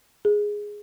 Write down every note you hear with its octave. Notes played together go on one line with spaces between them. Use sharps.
G#4